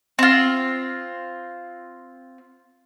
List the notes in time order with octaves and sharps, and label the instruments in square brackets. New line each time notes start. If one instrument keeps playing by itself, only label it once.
[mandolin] C4 F4